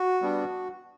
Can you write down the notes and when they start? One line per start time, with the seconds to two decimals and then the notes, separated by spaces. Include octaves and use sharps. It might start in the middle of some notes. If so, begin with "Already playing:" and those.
Already playing: F#4
0.22 G3 B3 D4